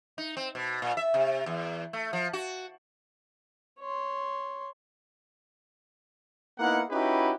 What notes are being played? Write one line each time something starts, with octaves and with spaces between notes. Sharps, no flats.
D#4
C4
B2
A#2
E5
C3
E2
A3
F3
F#4
C#5 C6
A#3 B3 D#4 E4 F#5
C#4 D#4 E4 F#4 G4 B4